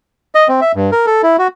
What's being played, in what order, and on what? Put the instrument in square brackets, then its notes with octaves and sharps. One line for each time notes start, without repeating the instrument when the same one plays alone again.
[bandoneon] D#5
C4
E5
G2
A#4
A4
E4
F#4